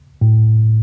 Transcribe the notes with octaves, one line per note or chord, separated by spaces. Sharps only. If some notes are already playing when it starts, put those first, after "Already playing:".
A2